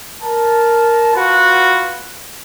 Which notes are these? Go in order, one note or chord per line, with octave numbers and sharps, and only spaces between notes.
A#4 A5
F4 F#4 B4